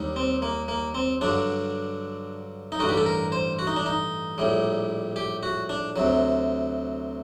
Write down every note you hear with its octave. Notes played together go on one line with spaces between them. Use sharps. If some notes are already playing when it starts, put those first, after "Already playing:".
Already playing: D#2 D#3 G3
C4
A#3
A#3
C4
G2 D3 F#3 D4
D#4
A1 G2 D3 G3 F#4
G4
A4
A#4
C5
F#4
D#4
D4
D#4
A#1 A2 G3
G4
F#4
D4
D2 C3 F#3